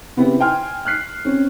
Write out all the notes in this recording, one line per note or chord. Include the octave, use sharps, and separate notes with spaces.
C#3 B3 C4 E4 G4
G5 G#5 C6 F6
F6 F#6 C7
C4 C#4